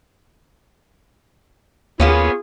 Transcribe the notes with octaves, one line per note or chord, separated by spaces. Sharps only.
D#2 A#3 B3 C#4 F4 G#4